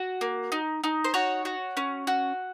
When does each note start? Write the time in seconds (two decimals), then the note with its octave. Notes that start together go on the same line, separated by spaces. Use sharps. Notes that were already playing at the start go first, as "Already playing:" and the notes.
Already playing: F#4
0.21 A#3
0.52 D#4
0.84 D#4
1.04 C5
1.14 F#4 C#5
1.45 F#4
1.77 C#4
2.07 F#4